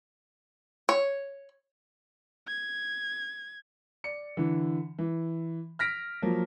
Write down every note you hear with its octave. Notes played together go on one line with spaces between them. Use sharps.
C#5
G#6
D5 C#7
D3 E3
E3
F6 A#6 B6 D7
F3 F#3 A#3